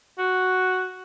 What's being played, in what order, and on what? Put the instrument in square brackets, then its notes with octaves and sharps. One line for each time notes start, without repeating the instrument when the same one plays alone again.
[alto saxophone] F#4